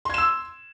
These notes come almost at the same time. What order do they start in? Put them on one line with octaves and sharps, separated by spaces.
C6 G#6 E7 E6